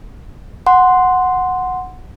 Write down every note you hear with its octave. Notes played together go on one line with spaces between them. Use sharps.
F#5 C6